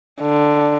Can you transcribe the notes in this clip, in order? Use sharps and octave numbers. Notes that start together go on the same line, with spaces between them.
D3